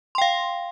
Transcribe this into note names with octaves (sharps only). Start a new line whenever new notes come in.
F5 G5 C6